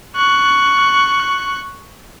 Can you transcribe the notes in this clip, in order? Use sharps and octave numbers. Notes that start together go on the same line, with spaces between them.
C#6 F#6